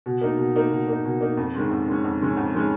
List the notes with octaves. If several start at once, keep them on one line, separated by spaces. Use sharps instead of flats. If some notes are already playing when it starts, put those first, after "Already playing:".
B2
A#3 D#4
B2
A#3 D#4
B2
A#3 D#4
B2
A#3 D#4
F2
D#3 G#3 C#4
F2
D#3 G#3 C#4
F2
D#3 G#3 C#4
F2
D#3 G#3 C#4